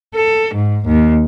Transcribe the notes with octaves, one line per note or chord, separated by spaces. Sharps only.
A4
G#2
D#2